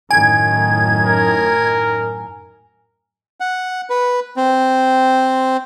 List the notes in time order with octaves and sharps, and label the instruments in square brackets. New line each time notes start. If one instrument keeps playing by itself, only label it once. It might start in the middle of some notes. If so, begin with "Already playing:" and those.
[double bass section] F#2 A2 D#3 [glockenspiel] G#5 [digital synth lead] G#6
[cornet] A#4
[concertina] F#5
B4
C4